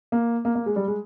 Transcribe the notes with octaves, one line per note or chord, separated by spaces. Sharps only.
A#3
A#3
A#3
G#3
G3
G#3